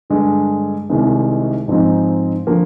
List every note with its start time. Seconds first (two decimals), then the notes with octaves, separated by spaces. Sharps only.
0.10 G2 D3 G#3
0.90 C2 C3 D#3 G#3
1.68 G#2 F3 G#3 C4 D#4
2.47 D3 F3 A#3